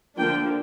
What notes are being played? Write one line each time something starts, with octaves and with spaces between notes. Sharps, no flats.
D3 F3 A#3 D4 G5